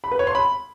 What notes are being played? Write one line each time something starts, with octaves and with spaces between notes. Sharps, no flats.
B5
B4
C#5
C6
B5